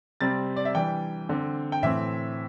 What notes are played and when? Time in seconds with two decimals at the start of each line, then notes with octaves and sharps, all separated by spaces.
0.21 C3 G3 C4 A6
0.57 D5
0.65 E5
0.75 E3 G3 D4 G5
1.29 D3 C4
1.72 G5
1.82 A2 E3 C4 E5